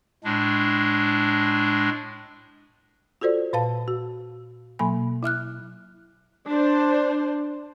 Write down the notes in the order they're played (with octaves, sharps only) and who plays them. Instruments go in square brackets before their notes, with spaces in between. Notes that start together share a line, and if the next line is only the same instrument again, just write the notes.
[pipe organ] A2 G#3 D4
[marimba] F4 F#4 A4 C5 D5
A#2 B4 F5 A5
F#4
B2 F#3 A#3 G#5 B5
E4 E5 F6 F#6
[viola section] D4 C5